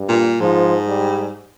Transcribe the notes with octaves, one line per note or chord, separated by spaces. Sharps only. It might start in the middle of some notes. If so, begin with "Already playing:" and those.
Already playing: G2
A#2
G#2 F3
G3